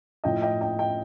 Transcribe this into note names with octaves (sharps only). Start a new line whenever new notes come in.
A2 F3 D#5 G5
D#5 G5
D#5 G5
D#5 G5